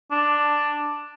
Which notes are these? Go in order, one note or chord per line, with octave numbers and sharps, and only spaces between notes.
D4